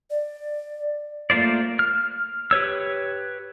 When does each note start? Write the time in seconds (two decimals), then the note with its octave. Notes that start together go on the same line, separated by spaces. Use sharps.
0.10 D5
1.30 A3 A#3 F4 C5 D5
1.79 F6
2.51 G4 B4 C#5 E6